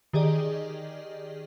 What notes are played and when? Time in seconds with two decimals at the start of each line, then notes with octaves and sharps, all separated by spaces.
0.13 D#3 G4 G#4 D5 D#5